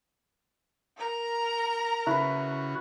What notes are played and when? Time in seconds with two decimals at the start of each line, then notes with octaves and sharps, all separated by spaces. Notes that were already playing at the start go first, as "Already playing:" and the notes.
0.97 A#4 A#5
2.07 C#3 E4 F#4 B4